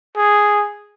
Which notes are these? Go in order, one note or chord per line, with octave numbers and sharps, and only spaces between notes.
G#4